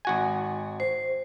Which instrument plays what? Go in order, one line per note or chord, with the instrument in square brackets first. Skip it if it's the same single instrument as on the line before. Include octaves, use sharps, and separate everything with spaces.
[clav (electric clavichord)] G#1 F#4 G#5
[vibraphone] C5